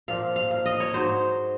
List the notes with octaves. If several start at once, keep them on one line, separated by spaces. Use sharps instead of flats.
A#2 F3 F5
F5
F5
D#5
C#5
G#2 F#3 C5